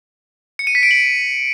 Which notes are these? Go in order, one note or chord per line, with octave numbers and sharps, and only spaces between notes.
C#7
D#7
B6
D7
F#7